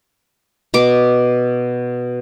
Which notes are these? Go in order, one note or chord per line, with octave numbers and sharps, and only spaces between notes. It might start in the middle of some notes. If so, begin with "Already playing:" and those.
B2 D6